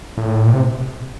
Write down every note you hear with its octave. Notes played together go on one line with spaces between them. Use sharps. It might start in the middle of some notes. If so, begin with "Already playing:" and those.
A2
A#2
C3